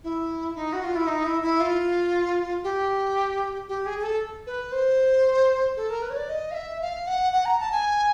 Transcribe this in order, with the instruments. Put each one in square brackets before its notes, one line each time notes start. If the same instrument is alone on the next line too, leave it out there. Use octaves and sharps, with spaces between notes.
[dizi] E4
D#4
F#4
F4
E4
D#4
E4
E4
F4
G4
G4
G#4
G#4
A4
B4
C5
A4
A#4
B4
C#5
D5
D#5
F5
E5
F5
F#5
F#5
A#5
A5
G#5